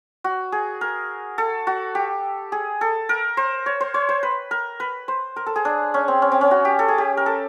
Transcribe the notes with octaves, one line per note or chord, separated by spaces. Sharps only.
F#4
G#4
A#4
A4
F#4
G4
G#4
A4
A#4
C5
C#5
C5
C#5
C5
B4
A#4
B4
C5
A#4
A4
G#4
D4
C#4
C4
C#4
C4
C#4
F#4
G4
A4
G#4
G4
A#4
A4